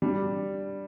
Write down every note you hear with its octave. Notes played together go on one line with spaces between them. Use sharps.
G3 D4